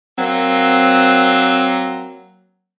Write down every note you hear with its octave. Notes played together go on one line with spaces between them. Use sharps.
F#3 A#3 C4